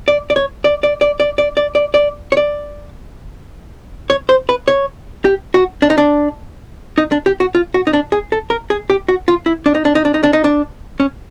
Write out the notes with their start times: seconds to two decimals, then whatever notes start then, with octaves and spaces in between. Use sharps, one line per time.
0.08 D5
0.30 D5
0.36 C#5
0.64 D5
0.83 D5
1.01 D5
1.20 D5
1.38 D5
1.57 D5
1.75 D5
1.94 D5
2.32 C#5
2.37 D5
4.10 C#5
4.29 C5
4.49 B4
4.68 C#5
5.25 G4
5.54 F#4
5.82 D4
5.90 D#4
5.98 D4
6.98 D#4
7.12 D4
7.26 G4
7.40 F#4
7.55 F4
7.74 F#4
7.87 D#4
7.93 D4
8.12 G#4
8.32 A4
8.50 A#4
8.70 G#4
8.90 G4
9.08 F#4
9.28 F4
9.46 E4
9.66 D4
9.75 D#4
9.85 D4
9.95 D#4
10.05 D4
10.14 D#4
10.23 D4
10.33 D#4
10.44 D4
11.00 C#4